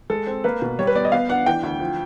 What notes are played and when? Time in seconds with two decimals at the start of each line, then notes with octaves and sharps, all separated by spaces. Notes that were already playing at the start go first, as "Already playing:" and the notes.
0.10 G#3 A4
0.27 C4
0.44 A#3 B4
0.62 B2
0.79 G3 C#5
0.87 B4
0.95 B3 D5
1.05 D#5
1.12 B3 F5
1.29 D4 F#5
1.46 E3 G5
1.63 D2
1.80 F3